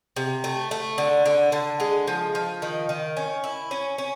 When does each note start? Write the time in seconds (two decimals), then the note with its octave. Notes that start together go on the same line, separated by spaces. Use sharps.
0.16 C3
0.44 A3
0.71 A3
0.98 D3
1.26 D3
1.52 D3
1.80 G#3
2.07 F3
2.35 F3
2.62 D#3
2.89 D#3
3.17 C#4
3.44 E4
3.71 C#4
3.98 C#4